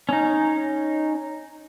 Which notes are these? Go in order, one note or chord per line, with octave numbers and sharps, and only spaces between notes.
C#4 D#4